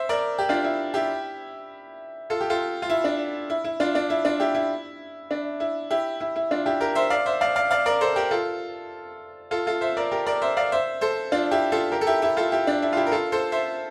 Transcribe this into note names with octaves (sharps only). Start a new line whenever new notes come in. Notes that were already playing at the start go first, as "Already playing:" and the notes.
Already playing: C5 E5
A#4 D5
G4
D4 F4
E4
E4 G4
F4 A4
G4
F4 A4
F4
E4
D4
E4
E4
D4 F4
D4
E4
D4 F4
E4 G4
E4
D4
E4
E4 G4
E4
E4
D4 F4
E4 G4
G4 A#4
C5 E5
D5 F5
C5 E5
D5 F5
D5 F5
D5 F5
A#4 D5
A4 C5
G4 A#4
F4 A4
F4 A4
F4 A4
C5 E5
A#4 D5
G4 A#4
A#4 D5
C5 E5
D5 F5
C5 E5
A4 C5
D4 F4
E4 G4
F4 A4
G4 A#4
A4
E4 G4
E4 G4
F4 A4
E4 G4
D4
E4
F4
E4 G4
A#4
F4 A4
A4 C5
C5 E5